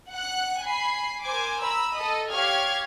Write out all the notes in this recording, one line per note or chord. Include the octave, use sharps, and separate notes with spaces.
F#5 F#6
G#5 B5 C7
A#4 C5 G#5 D6
A#5 B5 E6
A4 D#5 D#6
G4 C#5 F5 F6 G#6